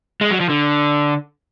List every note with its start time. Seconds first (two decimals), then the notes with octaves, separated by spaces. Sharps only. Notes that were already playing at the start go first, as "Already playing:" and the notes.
0.21 G#3
0.31 F#3
0.40 F3
0.49 D3